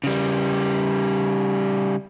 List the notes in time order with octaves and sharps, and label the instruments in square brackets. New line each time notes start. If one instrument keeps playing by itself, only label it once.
[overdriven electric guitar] C#3 G3